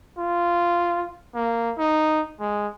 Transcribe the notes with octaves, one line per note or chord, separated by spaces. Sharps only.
F4
A#3
D#4
G#3